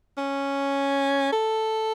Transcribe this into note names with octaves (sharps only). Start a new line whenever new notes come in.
C#4
A4